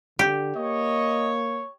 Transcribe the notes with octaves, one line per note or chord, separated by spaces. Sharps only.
D3 G4
A#3 C#5 D#5